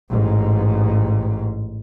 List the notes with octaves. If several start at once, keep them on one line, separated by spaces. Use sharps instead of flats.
A1 G#2